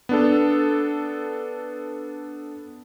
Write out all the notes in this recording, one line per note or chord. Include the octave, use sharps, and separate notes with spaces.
B3 D4 A4